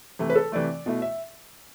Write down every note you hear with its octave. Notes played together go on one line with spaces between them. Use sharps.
C3 E3 A3
B4
A4
C3 E3 A3 D5
B2 A3 E4
E5